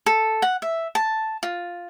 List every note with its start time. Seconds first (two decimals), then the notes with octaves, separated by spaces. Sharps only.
0.06 A4
0.42 F#5
0.62 E5
0.95 A5
1.43 F4